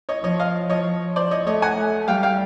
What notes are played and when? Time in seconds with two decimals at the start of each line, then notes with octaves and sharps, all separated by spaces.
0.09 C#5 D#5
0.24 F3 C#5 D#5
0.40 D#5 F5
0.69 C#5 D#5
1.16 C5 D5
1.31 C#5 D#5
1.46 A3 C#5 D#5
1.62 F#5 G#5
1.77 A3
2.08 G3 F5 G5
2.23 F5 G5